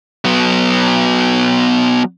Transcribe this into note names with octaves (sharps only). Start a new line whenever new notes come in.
F#3 B3